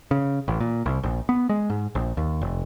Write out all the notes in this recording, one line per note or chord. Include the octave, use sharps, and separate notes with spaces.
C#3
A1
A#2
C2
A#1
B3
G#3
G#2
A#1
D#2
F1